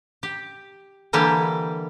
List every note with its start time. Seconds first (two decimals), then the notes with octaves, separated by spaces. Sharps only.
0.23 G4
1.13 D3 E3 G3 A#3 G4